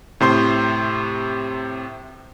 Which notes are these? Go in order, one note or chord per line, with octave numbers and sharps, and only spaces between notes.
A2 C3 C5 C6